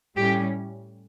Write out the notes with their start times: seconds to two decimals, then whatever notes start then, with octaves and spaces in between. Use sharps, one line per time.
0.16 A2 G3 C#4 G4